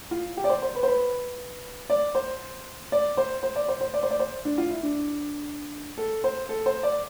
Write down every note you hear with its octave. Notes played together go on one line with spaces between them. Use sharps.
F4
G4
D5
C5
C5
B4
C5
B4
D5
C5
D5
C5
C5
D5
C5
C5
D5
C5
D5
C5
D4
F4
E4
D4
A4
C5
A4
C5
D5